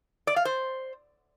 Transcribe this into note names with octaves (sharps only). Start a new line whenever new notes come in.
D5
F5
C5